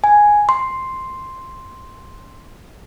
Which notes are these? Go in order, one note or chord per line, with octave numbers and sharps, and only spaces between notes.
G#5
C6